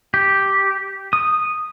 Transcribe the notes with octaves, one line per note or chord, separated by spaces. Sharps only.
G4
D#6